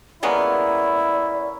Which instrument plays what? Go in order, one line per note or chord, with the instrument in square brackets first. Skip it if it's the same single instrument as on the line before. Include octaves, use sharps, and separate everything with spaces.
[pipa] G3 G#3 B3 [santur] A#3 C#4 A#5 [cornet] E4 [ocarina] D5